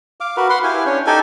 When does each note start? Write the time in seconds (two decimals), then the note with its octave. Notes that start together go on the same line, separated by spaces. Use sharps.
0.20 F5 D6
0.37 F#4 A#4 B4
0.50 B4 F#5 C6
0.64 E4 G4 F5 G#5
0.86 C#4 D4 C#5
1.06 D#4 G4 A4 G#5